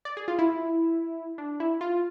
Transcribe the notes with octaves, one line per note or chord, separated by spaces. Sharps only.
D5
G#4
F4
E4
D4
E4
F4